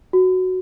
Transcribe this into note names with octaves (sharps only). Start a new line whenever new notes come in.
F#4